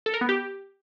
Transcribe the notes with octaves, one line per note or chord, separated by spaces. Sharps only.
A4
A#4
B3
G4